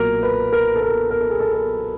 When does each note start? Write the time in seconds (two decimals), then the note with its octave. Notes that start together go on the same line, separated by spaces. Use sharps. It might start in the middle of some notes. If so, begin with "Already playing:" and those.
Already playing: B1 A#2 F#3 A#3 A#4
0.23 B4
0.53 A#4
0.76 A4
0.81 A#4
1.10 A#4
1.21 A4
1.30 G#4
1.40 A4
1.54 A#4